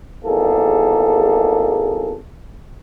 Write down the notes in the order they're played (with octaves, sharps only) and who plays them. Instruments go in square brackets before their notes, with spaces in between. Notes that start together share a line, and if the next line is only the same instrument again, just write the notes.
[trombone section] G#1 E2 A#3 G#4 A4